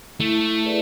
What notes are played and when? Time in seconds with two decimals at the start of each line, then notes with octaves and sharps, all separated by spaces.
0.20 A3 E4
0.64 G#4 B4 D5